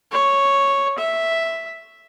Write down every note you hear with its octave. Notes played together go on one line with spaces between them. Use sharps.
C#5
E5